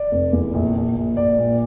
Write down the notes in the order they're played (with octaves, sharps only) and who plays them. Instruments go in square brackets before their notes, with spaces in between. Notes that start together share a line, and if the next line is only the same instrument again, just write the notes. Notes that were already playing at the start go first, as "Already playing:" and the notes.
Already playing: [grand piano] D5
F1
E2
A#1
A#1
A#1
A#1 D5
A#2